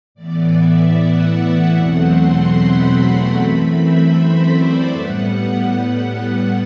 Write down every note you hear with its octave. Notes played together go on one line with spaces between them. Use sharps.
A2 E3 B3 D5
E5
F#5
E2 B2 F#3 A3 C4
C6
B5
B5
F#2 E3 A3 C4
E5
C5
D5
A2 G3 B3 F#5
F#5